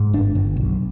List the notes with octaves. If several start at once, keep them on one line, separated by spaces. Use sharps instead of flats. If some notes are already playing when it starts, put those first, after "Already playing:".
Already playing: G#2
G1 D4
G1
B1